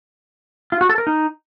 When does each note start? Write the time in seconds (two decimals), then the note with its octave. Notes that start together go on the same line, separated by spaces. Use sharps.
0.72 F4
0.81 F#4
0.89 A4
0.98 A#4
1.07 D#4